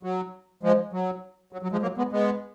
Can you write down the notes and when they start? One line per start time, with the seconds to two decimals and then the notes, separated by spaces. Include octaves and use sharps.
0.03 F#3
0.63 F3 G#3
0.93 F#3
1.53 F#3
1.63 F#3
1.72 F3 G#3
1.82 F#3 A#3
1.98 G#3 B3
2.12 G#3 B3